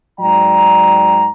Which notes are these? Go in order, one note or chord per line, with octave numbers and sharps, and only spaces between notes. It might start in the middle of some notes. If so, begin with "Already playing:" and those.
G#2 F#3 D5 G5 A#5